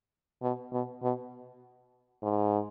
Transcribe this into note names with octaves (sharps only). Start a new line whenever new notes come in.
B2
B2
B2
G#2